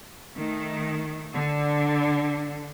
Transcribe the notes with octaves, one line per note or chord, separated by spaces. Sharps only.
D#3 A3
D3